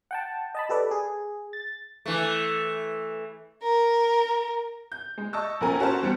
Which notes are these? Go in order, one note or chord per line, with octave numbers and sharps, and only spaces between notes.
F#5 G5 A5
D#5 A5 B5
G4 A4 B4 D5
G#4
A6
E3 A3
A#4
G6
G#3
D#5 A5 C#6 E6
A#1 C#4 A#4 G#5
C#4 F#4 A#4 C5 A5
E2 G3 C4 C#7